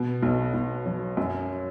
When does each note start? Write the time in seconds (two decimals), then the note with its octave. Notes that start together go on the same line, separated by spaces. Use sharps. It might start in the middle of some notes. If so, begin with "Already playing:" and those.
Already playing: B2
0.22 B1
0.54 B1
0.86 F#3
1.17 F#2